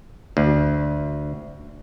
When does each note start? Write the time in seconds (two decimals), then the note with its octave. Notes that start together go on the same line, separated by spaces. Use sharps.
0.37 D2